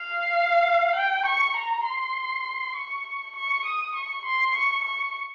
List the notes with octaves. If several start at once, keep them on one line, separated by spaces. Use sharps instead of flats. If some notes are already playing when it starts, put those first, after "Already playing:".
Already playing: F5
G5
C#6
A#5
C6
C#6
C#6
D#6
C#6
C6
C#6
C#6